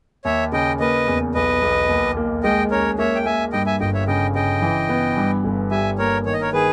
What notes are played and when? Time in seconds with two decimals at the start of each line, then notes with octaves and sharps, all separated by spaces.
0.25 D#2 C#5 E5
0.52 C#3 D#5 G5
0.80 A#3 B4 D#5
1.08 E2
1.34 B1 B4 D#5
1.61 B1
1.89 D#2
2.17 A#3
2.43 G#3 D#5 G5
2.71 C#4 A#4 C#5
2.98 A#3 C#5 E5
3.15 G5
3.25 A#3 E5 G#5
3.52 G2 D#5 G5
3.67 E5 G#5
3.80 G1 D#5 G5
3.94 C#5 E5
4.07 C#3 D#5 G5
4.35 C#3 D#5 G5
4.62 E3
4.89 B3
5.17 G2
5.44 G1
5.71 G3 E5 G#5
5.98 A#3 A#4 C#5
6.26 D#3 C#5
6.34 D#5
6.41 A#4 C#5
6.53 D#3 G#4 B4